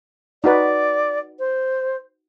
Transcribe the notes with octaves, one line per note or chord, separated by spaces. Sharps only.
D#4 F#4 B4 D5
C5